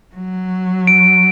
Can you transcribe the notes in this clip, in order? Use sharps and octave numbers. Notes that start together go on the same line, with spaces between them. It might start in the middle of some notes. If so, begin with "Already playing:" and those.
F#3
D7